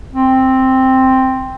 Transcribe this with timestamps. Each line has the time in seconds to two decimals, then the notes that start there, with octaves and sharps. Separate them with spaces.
0.12 C4